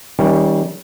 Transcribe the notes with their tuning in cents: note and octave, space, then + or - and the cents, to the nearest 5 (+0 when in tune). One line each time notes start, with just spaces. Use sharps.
D#3 +35 G3 +0 C#4 -5